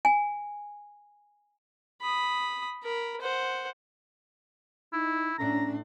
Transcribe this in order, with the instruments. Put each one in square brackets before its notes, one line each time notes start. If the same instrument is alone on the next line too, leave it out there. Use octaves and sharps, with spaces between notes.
[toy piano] G#5
[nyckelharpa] B5 D#6
A#4 B5
C5 F#5
[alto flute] D#4 [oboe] E4
[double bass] A2 D4 [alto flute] C#4 [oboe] A#5